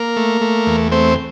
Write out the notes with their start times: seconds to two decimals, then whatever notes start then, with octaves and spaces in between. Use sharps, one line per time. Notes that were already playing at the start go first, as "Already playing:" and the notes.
Already playing: A#3 A#4
0.16 A3
0.41 A3
0.67 E2
0.92 A3 C4 C5